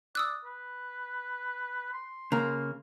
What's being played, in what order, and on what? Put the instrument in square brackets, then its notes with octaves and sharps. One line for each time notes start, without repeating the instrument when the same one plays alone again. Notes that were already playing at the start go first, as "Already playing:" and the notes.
[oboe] D5 [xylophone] D#6 E6 F#6
[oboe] B4
C6
[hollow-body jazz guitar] C#3 A#3 [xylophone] A#5